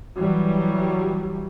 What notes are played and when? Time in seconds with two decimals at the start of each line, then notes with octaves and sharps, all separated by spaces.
0.20 E3 F#3 G3